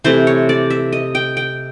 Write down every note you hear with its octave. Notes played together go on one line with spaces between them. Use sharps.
C3 E3 A3 C5
C#5
D5
E5
D#5
G5
G5